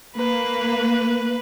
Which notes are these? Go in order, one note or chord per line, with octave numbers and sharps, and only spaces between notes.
A#3 B4